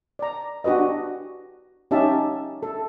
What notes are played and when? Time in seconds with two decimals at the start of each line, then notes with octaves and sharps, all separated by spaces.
0.19 D5 A#5
0.64 D4 F#4 G4 B4 D#5
1.91 C#4 D#4 G4 E5 F5 A5
2.63 A4